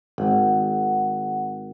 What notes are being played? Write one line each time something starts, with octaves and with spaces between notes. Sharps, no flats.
G#1 F#5